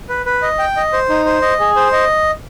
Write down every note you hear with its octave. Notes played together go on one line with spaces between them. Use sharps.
B4
B4
D#5
G5
D#5
C5
D#4
C5
D#5
G#4
C5
D#5